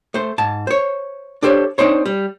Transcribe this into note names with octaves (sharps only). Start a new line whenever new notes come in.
A3 C5
G#2 A5
C5 C#5
D4 G4 A4 C5 C#5
C4 D4 D#4 C5 C#5
G3